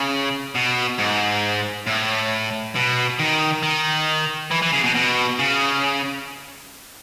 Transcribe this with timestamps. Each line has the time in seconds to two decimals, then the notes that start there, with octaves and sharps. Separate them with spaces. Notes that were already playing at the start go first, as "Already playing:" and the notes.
Already playing: C#3
0.55 B2
0.98 G#2
1.87 A2
2.75 B2
3.19 D#3
3.63 D#3
4.51 E3
4.62 E3
4.73 C#3
4.84 B2
4.95 B2
5.39 C#3